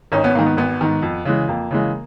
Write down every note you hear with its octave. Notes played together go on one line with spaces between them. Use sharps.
G#1 C#4 D#4
B3 C#4
G#2 D#3 A#3
B3
G#1 B3
G#2 D#3
F2
C#3 E3 G#3
F2 A#3
C#3 E3 G#3